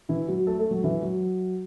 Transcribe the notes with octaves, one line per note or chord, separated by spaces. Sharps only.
E3 E4
F#3 F#4
A3 A4
A3 A4
F#3
E3
F#3